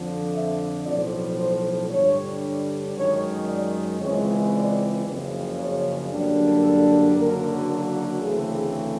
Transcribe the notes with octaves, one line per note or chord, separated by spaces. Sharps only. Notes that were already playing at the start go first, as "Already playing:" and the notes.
Already playing: F2 D3 F3
E5
B1 A2 F3 D5
C5
G2 D3 G3 C#5
F#2 D#3 G#3 C#5
D5
C#2 C#3 E3 G#3 C4 C#5
D5
F#1 F2 C#3
C#5
F#2 D3 G3 A#3 D4
A4
F#1 F#2 D3 F#3 A#3 A#4
D2 C#3 E3 A3 C4 G#4